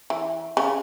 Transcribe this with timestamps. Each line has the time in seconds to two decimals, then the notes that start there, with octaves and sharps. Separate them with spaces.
0.10 E3
0.57 C#3